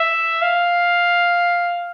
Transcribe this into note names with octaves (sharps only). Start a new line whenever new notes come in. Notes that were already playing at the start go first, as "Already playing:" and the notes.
Already playing: E5
F5